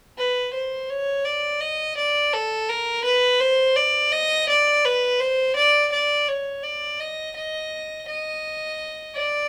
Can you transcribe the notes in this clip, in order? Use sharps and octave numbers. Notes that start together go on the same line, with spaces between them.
B4
C5
C#5
D5
D#5
D5
A4
A#4
B4
C5
D5
D#5
D5
B4
C5
D5
D5
C#5
D5
D#5
D#5
D#5
D5